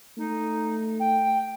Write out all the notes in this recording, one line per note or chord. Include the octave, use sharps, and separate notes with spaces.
A3 D#4
G5